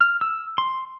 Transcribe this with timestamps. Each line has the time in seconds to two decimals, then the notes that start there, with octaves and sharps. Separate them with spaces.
0.01 F6
0.21 E6
0.58 C6